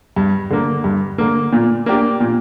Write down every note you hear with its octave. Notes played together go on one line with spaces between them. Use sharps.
G2
D3 A#3
G2
D3 A#3
A#2
A#3 D4 G4
A#2